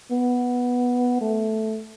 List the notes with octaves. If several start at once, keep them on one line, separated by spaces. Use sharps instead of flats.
B3
A3